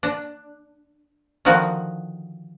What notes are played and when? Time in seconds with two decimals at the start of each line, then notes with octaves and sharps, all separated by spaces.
0.03 D4
1.45 D3 D#3 F3 F#4